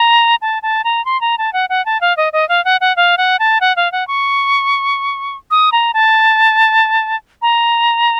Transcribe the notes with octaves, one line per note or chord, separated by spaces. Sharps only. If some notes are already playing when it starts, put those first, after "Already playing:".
Already playing: A#5
A5
A5
A#5
C6
A#5
A5
F#5
F#5
A5
F5
D#5
D#5
F5
F#5
F#5
F5
F#5
A5
F#5
F5
F#5
C#6
D#6
A#5
A5
A#5